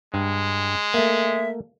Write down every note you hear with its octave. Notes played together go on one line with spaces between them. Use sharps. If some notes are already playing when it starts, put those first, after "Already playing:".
G2 G#3
A3 A#3 E5